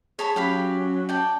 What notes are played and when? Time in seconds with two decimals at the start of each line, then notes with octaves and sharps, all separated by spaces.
0.19 G#4 C#5 A5 B5
0.36 F#3 C#4 G4 F5 B5
1.09 D5 G5 A5